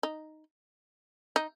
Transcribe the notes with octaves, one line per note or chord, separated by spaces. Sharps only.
D#4
D#4